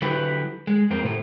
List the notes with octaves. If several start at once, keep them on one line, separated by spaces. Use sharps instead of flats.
D3 F#3 E4 G4 B4
G#3
F2 A#3 C4
A2 C3 A3